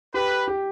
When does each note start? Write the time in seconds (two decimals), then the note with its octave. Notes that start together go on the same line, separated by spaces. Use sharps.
0.14 G4 B4
0.48 G4